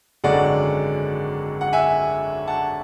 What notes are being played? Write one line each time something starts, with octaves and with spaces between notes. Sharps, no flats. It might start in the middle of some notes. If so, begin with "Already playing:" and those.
G#1 F#2 D3 G#3 D5 F#5
F#5
E5 G#5
F#5 A5